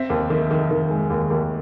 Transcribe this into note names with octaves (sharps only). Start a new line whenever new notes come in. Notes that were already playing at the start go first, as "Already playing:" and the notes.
Already playing: C4 E5
D#2
D#3
D#3
D#3
G#3
D#2
D#2